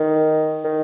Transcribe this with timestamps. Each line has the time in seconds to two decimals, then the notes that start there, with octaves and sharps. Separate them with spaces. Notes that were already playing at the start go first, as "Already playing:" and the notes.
Already playing: D#3
0.65 D#3